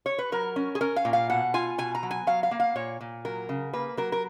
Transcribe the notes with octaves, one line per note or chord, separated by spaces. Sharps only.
C#5
B4
F#3 A#4
C#4
G#4
C#4 A#4
F5
A#2
F5
B2 F#5
F4 G#5
B2 G#5
A#5
F#3
G#5
F#3 F5
F5
A#3
F5
A#2 C#5
A#2
F#3 A#4
C#3
A#3 B4
F#3 A#4
A#4